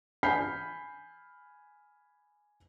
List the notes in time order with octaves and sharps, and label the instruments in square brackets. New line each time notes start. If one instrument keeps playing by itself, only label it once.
[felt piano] G#5 B5 F6 G6 B6 C7